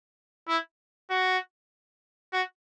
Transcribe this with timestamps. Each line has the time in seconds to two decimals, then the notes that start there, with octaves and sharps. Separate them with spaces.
0.48 E4
1.10 F#4
2.33 F#4